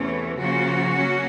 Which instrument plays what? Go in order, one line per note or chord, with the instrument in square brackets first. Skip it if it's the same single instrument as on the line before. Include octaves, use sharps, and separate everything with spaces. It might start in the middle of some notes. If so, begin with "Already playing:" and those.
Already playing: [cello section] E2 C3 E3 A3 C#4
C#3 F3 A#3 C#4 F#4
F#3 A#3 C#4